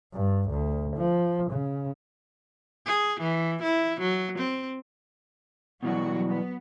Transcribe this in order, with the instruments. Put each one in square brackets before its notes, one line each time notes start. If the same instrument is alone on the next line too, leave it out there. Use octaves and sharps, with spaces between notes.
[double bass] G2
D2
F3
C#3
[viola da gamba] G#4
E3
E4
F#3
C4
[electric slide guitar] B2 E3 G3 [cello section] F#3 F#4
[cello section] B3